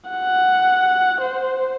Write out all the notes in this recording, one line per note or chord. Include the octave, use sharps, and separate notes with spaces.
F#5
C5